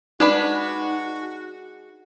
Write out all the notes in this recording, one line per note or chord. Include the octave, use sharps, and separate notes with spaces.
G#3 D4 D#4 F#4 B4